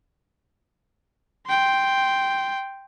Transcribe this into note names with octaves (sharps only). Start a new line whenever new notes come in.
G5 C6